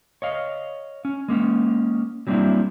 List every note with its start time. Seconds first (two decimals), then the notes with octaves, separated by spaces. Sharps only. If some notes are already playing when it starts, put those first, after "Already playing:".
0.22 C#5 D#5 F5
1.05 C#4
1.28 G#3 A#3 C#4
2.27 F#3 G3 A#3 C4 D4 E4